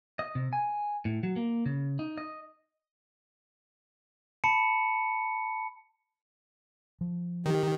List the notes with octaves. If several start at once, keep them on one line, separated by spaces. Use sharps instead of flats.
D#5
C3
G#5
A2
F#3
A#3
C#3
D#4
D#5
A5 B5 C#7
F3
D#3 G4